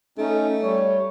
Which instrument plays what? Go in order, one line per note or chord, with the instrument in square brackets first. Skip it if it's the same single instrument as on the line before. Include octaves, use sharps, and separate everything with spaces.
[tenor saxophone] A3 [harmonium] C#4 D#4
[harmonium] G3 [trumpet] C#5